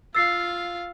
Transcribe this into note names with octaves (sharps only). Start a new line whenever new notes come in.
F4 F5 E6 A6 C7